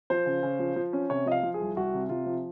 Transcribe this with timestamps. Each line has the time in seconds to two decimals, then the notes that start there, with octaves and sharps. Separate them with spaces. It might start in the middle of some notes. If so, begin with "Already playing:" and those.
0.10 F3 C5
0.26 C#3
0.43 C#3
0.59 F3
0.76 F3
0.93 C#4
1.10 C3 C#5
1.26 F3 D#5
1.32 F5
1.43 F3
1.54 G#4
1.60 C2
1.76 C2 F#4
1.94 C3
2.09 C3 F4
2.26 F3